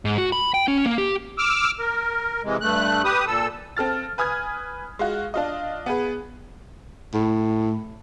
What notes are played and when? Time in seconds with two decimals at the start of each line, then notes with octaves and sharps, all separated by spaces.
0.05 G#2
0.18 F#4
0.32 B5
0.54 G5
0.68 C#4
0.85 A#3
0.98 G4
1.38 D6 E6 F6
1.79 A#4
2.44 C3 E3 G#3
2.61 G2 A3 F#6
3.04 G4 B4 D#6
3.27 A#2 A4 E6
3.77 C4 A4 F6 A6
4.18 B4 G#5 D#6 F6 G#6
4.99 G#3 F4 F#4
5.34 D4 F4 D#5
5.86 B3 G#4 B4
7.14 A2